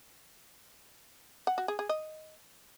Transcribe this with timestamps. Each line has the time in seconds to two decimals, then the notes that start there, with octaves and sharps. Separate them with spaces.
1.47 F#5
1.58 F#4
1.68 G#4
1.79 G#4
1.89 D#5